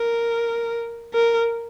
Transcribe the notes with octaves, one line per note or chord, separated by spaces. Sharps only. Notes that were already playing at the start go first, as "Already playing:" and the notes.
Already playing: A#4
A#4